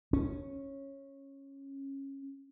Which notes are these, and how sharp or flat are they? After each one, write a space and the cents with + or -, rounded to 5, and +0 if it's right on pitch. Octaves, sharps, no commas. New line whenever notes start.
C#4 -15